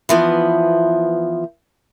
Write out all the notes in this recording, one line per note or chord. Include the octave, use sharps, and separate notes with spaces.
E3 F3 B3